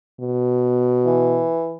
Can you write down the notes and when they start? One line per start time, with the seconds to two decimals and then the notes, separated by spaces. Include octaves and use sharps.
0.20 B2
1.06 E3